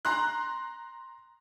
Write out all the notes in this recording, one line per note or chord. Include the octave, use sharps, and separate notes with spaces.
A#5 C6 F#6